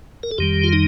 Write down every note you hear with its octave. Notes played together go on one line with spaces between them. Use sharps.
A#4
A4
F2 D#3 G3 G4
F4
D#4